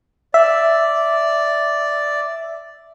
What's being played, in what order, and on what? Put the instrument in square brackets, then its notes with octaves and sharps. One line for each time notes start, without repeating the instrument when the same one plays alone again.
[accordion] D5 [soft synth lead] E5